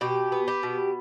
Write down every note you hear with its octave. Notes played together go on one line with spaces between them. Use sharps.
B2 G4
B3
G4
B2